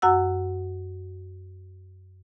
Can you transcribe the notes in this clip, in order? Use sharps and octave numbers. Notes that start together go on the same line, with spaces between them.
F#2 F#4 F#5 E6